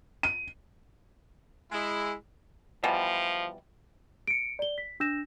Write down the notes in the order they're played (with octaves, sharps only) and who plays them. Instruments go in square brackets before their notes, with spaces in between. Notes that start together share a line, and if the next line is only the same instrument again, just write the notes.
[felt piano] D#7
[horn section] G#3 E4
[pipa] B2 E3 G3 [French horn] F3
[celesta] C#7 D7
D5 G7
B6
D4 E6 G6 A#6 E7